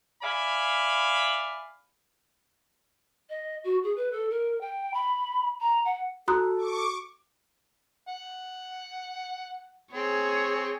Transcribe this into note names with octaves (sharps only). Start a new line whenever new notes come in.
D5 E5 F5 G#5 B5
D#5
F#4
G#4
B4
A4
A#4
G5
B5
A#5
F#5
F#4 A4 A#5 D#6 F#6
C#6 D6
F#5
C4 G#4 C#5